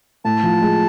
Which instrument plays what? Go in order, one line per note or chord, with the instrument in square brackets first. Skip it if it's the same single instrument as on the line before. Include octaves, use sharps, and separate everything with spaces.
[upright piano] A2 [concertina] A5
[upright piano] F3
G#3